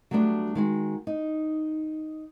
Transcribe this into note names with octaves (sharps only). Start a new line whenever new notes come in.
F#3 G3 A3 B3 D4
D#3 G#3 F#4
D#4